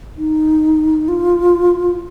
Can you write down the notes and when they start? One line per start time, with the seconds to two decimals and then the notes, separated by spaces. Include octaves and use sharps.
0.17 D#4
1.08 F4